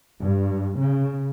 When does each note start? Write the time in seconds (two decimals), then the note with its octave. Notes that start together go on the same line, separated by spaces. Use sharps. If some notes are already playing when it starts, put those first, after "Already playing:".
0.20 G2
0.80 C#3